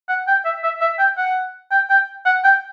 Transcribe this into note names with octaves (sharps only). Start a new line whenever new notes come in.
F#5
G5
E5
E5
E5
G5
F#5
G5
G5
F#5
G5